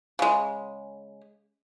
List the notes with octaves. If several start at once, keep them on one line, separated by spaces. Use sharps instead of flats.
C#3 G#3